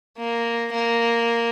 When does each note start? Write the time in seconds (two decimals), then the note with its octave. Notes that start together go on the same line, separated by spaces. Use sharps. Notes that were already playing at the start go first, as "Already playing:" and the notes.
0.18 A#3
0.73 A#3